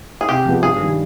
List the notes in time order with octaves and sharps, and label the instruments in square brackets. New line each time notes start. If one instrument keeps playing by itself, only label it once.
[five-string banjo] G#4
[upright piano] C3 [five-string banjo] G4
[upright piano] F3 G#3 B3
[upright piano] G2 [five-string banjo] G#4
[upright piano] D#3 G3